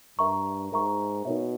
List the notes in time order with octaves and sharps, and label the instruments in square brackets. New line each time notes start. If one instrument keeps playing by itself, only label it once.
[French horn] G2 [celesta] A#4 E5 A#5 C#6
[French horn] G#2 [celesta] A#4 E5 A#5 C#6
[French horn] B2 [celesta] D#4 A#4 C#5 E5